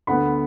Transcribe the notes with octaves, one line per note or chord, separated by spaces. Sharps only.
D2 D3 B3 F#5 B5